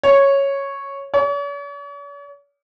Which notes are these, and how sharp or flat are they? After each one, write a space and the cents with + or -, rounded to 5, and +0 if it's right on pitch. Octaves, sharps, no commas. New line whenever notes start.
C#5 -5
C#5 +45